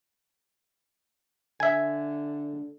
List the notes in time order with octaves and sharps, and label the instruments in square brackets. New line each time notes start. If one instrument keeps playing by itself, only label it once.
[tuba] D3 [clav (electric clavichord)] E5 G#5